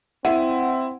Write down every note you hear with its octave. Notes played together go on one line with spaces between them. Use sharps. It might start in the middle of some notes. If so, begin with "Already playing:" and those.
C4 E4 F#5